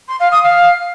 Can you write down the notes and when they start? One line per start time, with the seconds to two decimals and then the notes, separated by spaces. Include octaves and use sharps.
0.08 C6
0.19 F5
0.31 D#6
0.43 F5